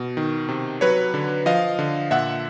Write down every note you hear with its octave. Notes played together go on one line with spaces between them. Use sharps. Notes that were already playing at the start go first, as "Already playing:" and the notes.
Already playing: B2
D#3
C3
F#3 B4 C#5
D3
F3 D#5 F5
D3
A#2 E5 F#5